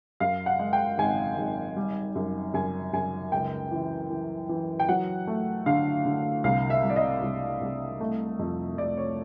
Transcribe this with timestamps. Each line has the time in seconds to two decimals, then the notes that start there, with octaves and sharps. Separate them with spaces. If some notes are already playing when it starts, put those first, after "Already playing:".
0.20 F#2 F5
0.46 F#5
0.59 G#3
0.73 G5
0.98 G#1 G#5
1.37 G#1
1.76 G3
2.15 F#2
2.54 F#2 G#5
2.93 F#2 G#5
3.32 C#2 G5
3.71 E3
4.10 E3
4.49 E3
4.80 G5
4.89 F#3 F#5
5.27 A3
5.66 D3 F5
6.05 D3
6.44 C2 F5
6.70 E5
6.83 G3
6.90 D5
6.96 D#5
7.22 C2
7.61 C2
8.00 A3
8.39 F2
8.78 F2 D5
8.97 C#5